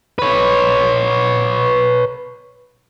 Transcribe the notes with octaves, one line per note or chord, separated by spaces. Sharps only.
B4 C#5